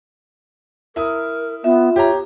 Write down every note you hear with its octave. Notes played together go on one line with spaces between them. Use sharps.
E4 A#4 D#6
B3 F4 E5
G4 C#5 A#5